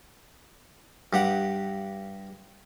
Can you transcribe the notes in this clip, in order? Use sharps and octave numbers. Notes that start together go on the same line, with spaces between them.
G2 G4 F#5